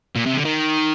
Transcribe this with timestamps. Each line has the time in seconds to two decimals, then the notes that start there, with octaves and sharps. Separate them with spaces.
0.16 A#2
0.26 C3
0.36 D3
0.45 D#3